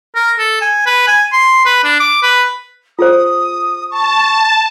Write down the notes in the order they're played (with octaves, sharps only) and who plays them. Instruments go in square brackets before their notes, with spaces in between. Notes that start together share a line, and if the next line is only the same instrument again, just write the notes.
[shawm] A#4
A4
G#5
B4
G#5
C6
B4
D4
D6
B4
[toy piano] F4 G#4 C5 [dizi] D#6
[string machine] A5 [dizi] C#6